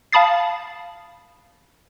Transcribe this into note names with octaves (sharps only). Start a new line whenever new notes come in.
F5 A5 B5 D#6 A6 C7